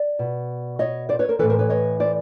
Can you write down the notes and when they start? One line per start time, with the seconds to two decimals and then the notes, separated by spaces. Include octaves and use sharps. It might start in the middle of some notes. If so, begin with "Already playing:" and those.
Already playing: D5
0.19 B2
0.79 C#5 D#5
1.09 C5 D5
1.19 B4 C#5
1.29 A#4 C5
1.39 A2 E3 A4 B4
1.49 A#4 C5
1.59 B4 C#5
1.69 C#5 D#5
2.00 C5 D5